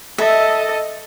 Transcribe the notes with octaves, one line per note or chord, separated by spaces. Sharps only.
A4 D#5 E5